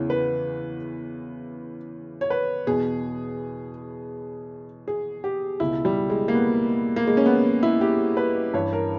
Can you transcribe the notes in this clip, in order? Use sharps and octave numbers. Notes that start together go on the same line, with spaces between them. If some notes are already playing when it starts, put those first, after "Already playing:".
Already playing: E2 C#3 E3 C#5
B4
C#5
B4
E2 B2 G#4
G#4
G4
C#2 B2 E4
G3
G#3
A#3
B3
A#3
G#3
C#4
B3
E4
G4
B4
G2 E3 C#5
A#4